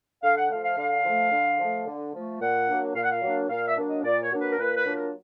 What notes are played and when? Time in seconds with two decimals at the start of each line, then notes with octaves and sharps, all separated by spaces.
0.23 D3 F5
0.37 F#5
0.50 F3 A3 F5
0.64 F5
0.78 D3 F5
1.05 F3 A3
1.32 D3
1.59 F3 A3
1.86 D3
2.14 F3 A3
2.41 A#2 F#5
2.68 F#3 A#3 D4
2.95 A#2 F5
3.03 F#5
3.10 F5
3.22 F#3 A#3 D4
3.50 A#2 F5
3.68 E5
3.77 F#3 A#3 D4
3.86 D#5
4.04 A#2 D5
4.22 C#5
4.32 F#3 A#3 D4
4.41 B4
4.51 A#4
4.58 A#2 B4
4.76 B4
4.85 F#3 A#3 D4 F4
4.95 A#4